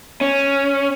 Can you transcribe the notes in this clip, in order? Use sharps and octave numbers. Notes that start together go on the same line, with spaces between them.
C#4